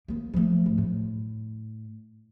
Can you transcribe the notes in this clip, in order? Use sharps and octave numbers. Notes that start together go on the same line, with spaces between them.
D#3 A#3
F3 A3
G#1
A2